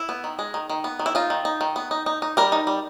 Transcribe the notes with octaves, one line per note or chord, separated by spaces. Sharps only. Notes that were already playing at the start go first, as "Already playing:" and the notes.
Already playing: E4
B3
D#3
G#3
D#3
D#3
B3
D#3
E4
D#4 F4
D#3
D#4
D#3
B3
D#4
D#4
D#4
G3 A#4
D#4
G3